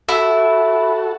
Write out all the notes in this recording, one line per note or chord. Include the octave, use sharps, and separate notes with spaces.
E4 F#4 A4